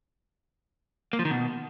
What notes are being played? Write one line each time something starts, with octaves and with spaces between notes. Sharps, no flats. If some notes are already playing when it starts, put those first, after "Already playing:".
A#3
F3
D#3
B2